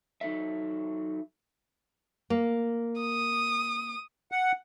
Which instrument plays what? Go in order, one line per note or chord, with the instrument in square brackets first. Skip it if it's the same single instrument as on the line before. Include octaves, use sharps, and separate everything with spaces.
[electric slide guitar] F#3 D#4 A4 E5
[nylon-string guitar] A#3
[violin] D#6
[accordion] F#5